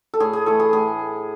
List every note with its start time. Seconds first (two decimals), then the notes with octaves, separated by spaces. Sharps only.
0.14 A4
0.20 A2 G#4
0.33 G#4
0.46 E3 A3 A4
0.60 G#4
0.73 A2 G#4